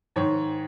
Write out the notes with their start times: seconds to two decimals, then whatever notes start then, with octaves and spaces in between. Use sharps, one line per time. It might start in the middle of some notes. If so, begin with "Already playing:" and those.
0.16 G#2 D#3 C#5